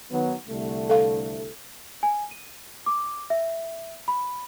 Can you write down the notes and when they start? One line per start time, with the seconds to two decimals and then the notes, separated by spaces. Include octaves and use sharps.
0.11 D#3 F#3 B3
0.48 C2 D3 A3
0.90 A4 F5
2.03 G#5
2.31 D#7
2.86 D6
3.30 E5
4.08 B5